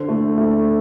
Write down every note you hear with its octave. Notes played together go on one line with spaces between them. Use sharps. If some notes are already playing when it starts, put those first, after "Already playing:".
Already playing: D3 C5
A3
A3